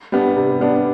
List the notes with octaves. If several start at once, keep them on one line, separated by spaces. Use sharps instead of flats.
G3 B3 D4
C3
G3 B3 D4